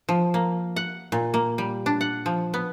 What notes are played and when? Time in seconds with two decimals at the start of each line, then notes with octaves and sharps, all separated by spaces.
0.09 F3
0.34 A#3
0.76 F#5
1.12 A#2
1.34 A#3
1.58 G3
1.86 D4
2.01 F#5
2.26 F3
2.54 B3